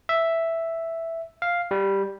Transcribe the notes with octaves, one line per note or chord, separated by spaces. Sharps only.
E5
F5
G3